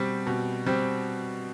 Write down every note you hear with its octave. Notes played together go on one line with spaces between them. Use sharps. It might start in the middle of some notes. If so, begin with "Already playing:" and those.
Already playing: B2 G3 C4
B2
G3 C4